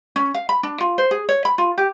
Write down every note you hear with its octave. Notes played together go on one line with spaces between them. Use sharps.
C#4
F5
B5
D4
F4
C5
G#4
C#5
B5
F4
G4